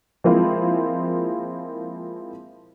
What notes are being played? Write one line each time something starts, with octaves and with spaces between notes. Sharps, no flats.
F3 G#3 A#3 C4 E4 F4